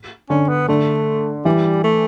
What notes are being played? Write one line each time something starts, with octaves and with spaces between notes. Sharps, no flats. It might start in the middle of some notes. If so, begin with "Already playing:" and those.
D3 C#4
B3
D3 A3
E3 G3
A3